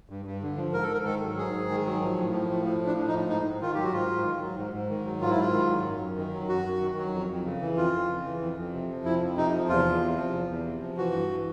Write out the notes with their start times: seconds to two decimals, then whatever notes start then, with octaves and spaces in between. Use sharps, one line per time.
0.10 G2
0.25 G2
0.42 D3
0.57 F3
0.73 G#2 A#4
0.83 A4
0.89 G#2 A#4
1.05 D#3 A4
1.21 F#3
1.37 G#2 G#4
1.53 G#2
1.69 D#3
1.86 F#3
2.02 F3
2.17 A2
2.33 F3
2.49 A2
2.65 F3
2.81 A2
2.87 D4
2.97 F3
3.08 D#4
3.13 A2
3.29 G#2 D#4
3.45 G#2
3.61 D#3 F4
3.74 F#3 G4
3.84 F#4
3.93 G#2 F4
4.09 G#2
4.25 D#3
4.41 F#3
4.57 G#2
4.73 G#2
4.90 D#3
5.05 F#3
5.21 G#2 F4
5.31 E4
5.37 G#2 F4
5.53 D#3
5.69 F#3
5.85 F#2
6.01 F#2
6.17 D#3
6.33 F#3
6.49 F#2 F#4
6.65 F#2
6.81 D#3
6.98 F#3
7.13 F2
7.29 F2
7.45 C#3
7.61 E3
7.77 F2 F4
7.93 F2
8.09 C#3
8.25 E3
8.41 F2
8.57 F2
8.73 C3
8.89 F3
9.05 F2 E4
9.21 F2
9.37 C3 D#4
9.53 F3
9.69 E2 F4
9.85 E2
10.01 C3
10.17 F3
10.33 E2
10.49 E2
10.65 C3
10.81 F3
10.97 E3 F#4
11.13 G2
11.29 E3